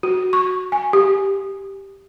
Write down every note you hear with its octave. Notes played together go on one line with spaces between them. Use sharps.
F#4
C#6
G#5
G4